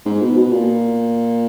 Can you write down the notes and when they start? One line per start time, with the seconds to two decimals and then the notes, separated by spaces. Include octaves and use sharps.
0.06 G#2
0.21 B2
0.37 B2
0.52 A#2